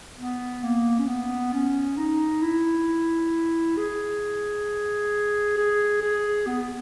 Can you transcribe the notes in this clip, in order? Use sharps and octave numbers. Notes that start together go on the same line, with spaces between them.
B3
A#3
C#4
B3
C#4
D#4
E4
G#4
G#4
G#4
B3